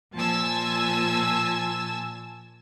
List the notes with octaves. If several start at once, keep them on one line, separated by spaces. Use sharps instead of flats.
A#2 F3 G#5 A5 E6